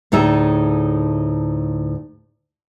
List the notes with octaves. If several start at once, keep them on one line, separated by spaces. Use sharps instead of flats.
D2 A2 D#4 G#4 E5